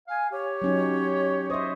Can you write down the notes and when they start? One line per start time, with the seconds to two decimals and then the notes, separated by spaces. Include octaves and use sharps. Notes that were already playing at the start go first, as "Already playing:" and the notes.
0.08 F5 G#5
0.32 G4 C#5
0.62 F#3 C#4 D#4
1.50 C5 D#5 E5 C#6 D#6